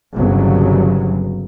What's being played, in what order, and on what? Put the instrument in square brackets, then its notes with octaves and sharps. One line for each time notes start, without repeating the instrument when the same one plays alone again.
[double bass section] G1 C2 C#3 F#3